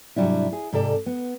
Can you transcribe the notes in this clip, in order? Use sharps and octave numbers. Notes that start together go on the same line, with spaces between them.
G#2 C3 F#3 G3 D4 E4
G#4
G#2 C3 A4 D5
B3